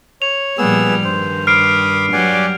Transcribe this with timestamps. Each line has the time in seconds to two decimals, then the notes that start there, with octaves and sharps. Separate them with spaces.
0.22 C#5 F7
0.58 A#2 F3 G3 B3 G#4 E6
1.04 G2 D#3 C5
1.47 B5 D6 D#6 F6 C7 D7
2.13 F#3 G3 G4 D5 F#5 G#5